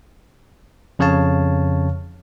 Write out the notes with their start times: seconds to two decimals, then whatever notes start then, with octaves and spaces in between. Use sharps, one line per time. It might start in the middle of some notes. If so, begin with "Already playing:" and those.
0.99 F2 C#3 C#5 F5 A5